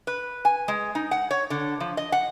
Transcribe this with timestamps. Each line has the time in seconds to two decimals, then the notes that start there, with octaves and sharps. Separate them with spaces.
0.07 B4
0.45 G#5
0.68 G#3
0.95 D#4
1.11 F#5
1.31 C#5
1.50 D3
1.80 F3
1.97 D#5
2.12 F#5